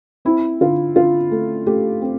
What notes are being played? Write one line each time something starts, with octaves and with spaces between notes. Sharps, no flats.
C4 E4
D3 F4
D3 F4
A3
A3 G4
C4